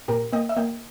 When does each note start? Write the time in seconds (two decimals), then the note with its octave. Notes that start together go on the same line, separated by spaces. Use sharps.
0.08 A#2 G4 A#4
0.33 A#3 D#5 G5
0.49 E5
0.57 A#3 D#5 G5